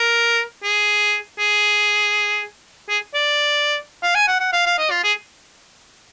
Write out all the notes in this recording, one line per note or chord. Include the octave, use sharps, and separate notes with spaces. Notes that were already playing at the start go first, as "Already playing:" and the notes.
Already playing: A#4
G#4
G#4
G#4
D5
F5
G#5
F#5
F#5
F5
F5
D#5
F4
G#4